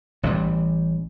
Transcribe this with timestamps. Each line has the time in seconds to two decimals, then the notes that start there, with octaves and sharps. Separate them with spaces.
0.23 A1 E3 F#3 G3